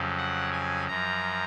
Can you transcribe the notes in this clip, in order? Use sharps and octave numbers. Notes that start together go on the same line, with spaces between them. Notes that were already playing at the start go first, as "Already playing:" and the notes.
Already playing: F2 C#3 F#3
F#5
G#5
F#2 F3 A#5